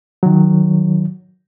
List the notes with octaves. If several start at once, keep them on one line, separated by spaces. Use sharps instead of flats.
D#3 F#3